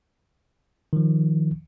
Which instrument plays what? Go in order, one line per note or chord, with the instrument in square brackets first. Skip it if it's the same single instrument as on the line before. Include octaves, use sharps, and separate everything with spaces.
[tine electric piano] D#3 F3